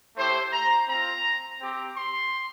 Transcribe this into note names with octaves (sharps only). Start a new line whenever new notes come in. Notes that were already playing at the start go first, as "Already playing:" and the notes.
A3 E4 G4 C5
A#5
C4 F4 A#5
C4 G4
C6